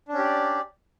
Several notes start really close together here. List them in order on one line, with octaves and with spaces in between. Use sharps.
D4 C#4 G4 D5